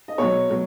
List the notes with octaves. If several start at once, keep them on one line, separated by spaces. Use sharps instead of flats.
D#5
B2 F#3 C#5
B2 F#3